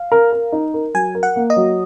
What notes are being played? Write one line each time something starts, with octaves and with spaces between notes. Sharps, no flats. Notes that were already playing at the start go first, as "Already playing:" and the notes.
Already playing: F5
A#4
A#4
D#4
A#4
F#3 G#5
A#4
F#5
A#3
D#5
F#3